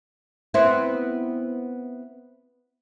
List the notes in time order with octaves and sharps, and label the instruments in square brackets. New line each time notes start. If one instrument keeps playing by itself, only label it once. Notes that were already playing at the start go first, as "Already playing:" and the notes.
[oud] B3 C4 E4